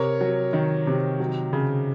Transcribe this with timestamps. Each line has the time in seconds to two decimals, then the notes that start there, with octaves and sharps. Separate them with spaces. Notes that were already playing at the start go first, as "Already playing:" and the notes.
Already playing: C3 A#4 C#5
0.21 F#3
0.53 D#3
0.87 C3
1.20 F#3
1.53 C#3